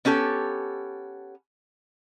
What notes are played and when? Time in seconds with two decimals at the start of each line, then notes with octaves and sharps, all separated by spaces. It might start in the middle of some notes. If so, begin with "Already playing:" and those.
0.05 B3 C#4 G4 A4